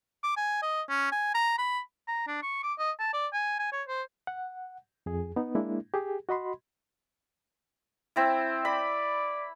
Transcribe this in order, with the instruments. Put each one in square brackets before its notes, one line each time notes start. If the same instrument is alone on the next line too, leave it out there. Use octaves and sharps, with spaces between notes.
[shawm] D6
G#5
D#5
C#4
G#5
A#5
B5
A#5
D4
C#6
D6
D#5
A5
D5
G#5
G#5
C#5
C5
[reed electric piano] F#5
F2 G#4
B3 D#4
G#3 A#3 D4 E4
G4 G#4
F#4 D#5 B5 C6
[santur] C4 E4
[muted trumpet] D5 [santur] B5